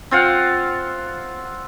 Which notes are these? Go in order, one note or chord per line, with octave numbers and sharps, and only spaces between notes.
C4 F4 F5 F#5